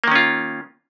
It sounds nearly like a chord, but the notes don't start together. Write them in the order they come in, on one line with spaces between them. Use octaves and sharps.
A#3 D#3 C#4 F4